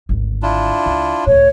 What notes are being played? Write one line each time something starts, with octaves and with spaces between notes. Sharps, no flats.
G#1 D2
D4 E4 F4
C#2
C#2 A2 C#5